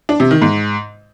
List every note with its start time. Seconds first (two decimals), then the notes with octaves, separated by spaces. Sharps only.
0.09 D4
0.20 C3
0.31 D#3
0.42 G#2